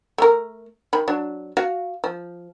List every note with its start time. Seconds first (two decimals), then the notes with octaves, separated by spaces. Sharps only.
0.18 A3 A#4
0.93 D#3 B5
1.08 F#3 D4
1.57 F#4 F5
2.04 F3